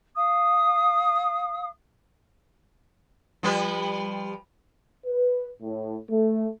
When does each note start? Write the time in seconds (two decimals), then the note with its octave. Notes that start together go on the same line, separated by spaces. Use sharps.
0.16 F5 D#6
3.43 F3 G3 B4
5.07 B4
5.63 A2
6.11 A3